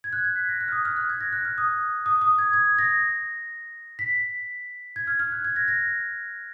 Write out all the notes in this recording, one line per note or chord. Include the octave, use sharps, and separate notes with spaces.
G#6
F#6
G#6
B6
A#6
F#6
F6
D#6
F6
F#6
G#6
A#6
F#6
F6
D#6
D#6
D#6
G#6
G#6
A#6
B6
G#6
F6
F6
F#6
G#6
A#6
A#6